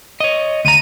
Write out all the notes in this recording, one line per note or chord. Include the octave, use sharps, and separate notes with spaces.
C#5 D#5
D2 A#5 D#7